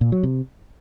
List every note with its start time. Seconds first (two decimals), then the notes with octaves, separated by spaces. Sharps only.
0.01 A#2
0.12 F#3
0.23 C3